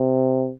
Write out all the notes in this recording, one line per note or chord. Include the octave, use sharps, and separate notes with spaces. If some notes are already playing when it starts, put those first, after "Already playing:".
Already playing: C3